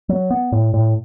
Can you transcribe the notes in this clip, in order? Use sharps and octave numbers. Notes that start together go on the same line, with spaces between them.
F#3
B3
A2
A2